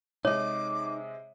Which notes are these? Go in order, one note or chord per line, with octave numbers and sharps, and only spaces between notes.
C3 G#3 D#4 C#5 D#5 D6